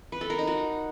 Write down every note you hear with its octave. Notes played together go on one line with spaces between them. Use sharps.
B4
A4
A#4
D#4
F#4